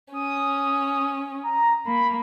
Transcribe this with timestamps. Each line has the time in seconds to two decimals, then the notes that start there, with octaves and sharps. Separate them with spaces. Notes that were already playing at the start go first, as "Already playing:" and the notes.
0.13 C#4 D#6
1.44 A#5
1.86 A#3 B5